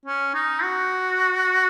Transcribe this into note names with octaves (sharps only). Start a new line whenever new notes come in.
C#4
D#4
F#4